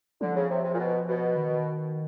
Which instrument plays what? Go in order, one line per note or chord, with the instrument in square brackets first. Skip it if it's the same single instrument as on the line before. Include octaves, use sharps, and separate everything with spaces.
[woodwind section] D3 [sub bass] F3
[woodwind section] C#3
C3
C3
A#2
B2
B2
[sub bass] D#3